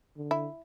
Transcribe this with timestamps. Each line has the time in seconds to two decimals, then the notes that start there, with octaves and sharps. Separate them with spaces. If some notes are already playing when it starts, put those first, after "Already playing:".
0.17 D3
0.31 E4